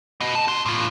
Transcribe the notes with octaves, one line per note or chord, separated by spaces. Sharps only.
B3 D#5
A5
F#4 C6
A2 F4